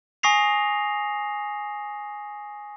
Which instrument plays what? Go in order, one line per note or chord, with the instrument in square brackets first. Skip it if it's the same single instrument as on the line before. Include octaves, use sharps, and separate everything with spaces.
[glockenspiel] G#5 C#6 D#6 A#6 C7 F7